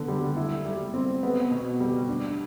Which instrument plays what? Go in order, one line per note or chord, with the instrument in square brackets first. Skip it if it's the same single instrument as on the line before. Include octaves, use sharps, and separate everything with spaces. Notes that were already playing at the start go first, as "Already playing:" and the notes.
Already playing: [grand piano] D3 B3
G3
E4
G3
C4
B3
B2
G3
D4